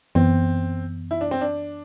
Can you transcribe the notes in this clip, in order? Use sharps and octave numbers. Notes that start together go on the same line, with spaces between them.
F#2 E3 B3 C4
E4
D4
C4
D4